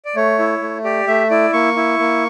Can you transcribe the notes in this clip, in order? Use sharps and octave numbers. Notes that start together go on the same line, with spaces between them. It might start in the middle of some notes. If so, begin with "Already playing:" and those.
D5
A3 C#5
E4
A3
G4 D5
A3 E5
E4 D5
A#3 C#6
E4
A#3